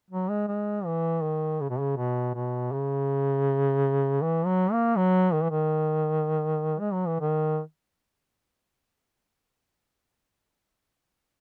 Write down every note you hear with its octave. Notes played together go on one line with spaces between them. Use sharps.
F#3
G#3
G#3
E3
D#3
C#3
B2
C#3
B2
B2
C#3
E3
F#3
A#3
F#3
D#3
E3
D#3
G#3
F#3
E3
D#3